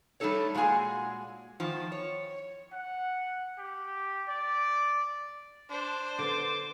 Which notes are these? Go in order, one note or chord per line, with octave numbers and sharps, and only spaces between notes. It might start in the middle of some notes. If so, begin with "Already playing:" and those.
G3 A3 D4 D#4 A4 C#5
A#2 G#3 F#4 G#4 G#5
E2 D#3 F3
C#5
F#5
G4
D5
D4 C5
D3 B3 D6